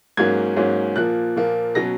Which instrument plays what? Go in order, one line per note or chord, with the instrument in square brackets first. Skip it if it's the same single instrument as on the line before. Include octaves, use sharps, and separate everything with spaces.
[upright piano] G#2 F#3 A#3 C#4 G#6
G#2 F#3 A#3 C#4
A#2 F3 A#3 F#6
A#2 F3 A#3
B2 F#3 C#4 A#6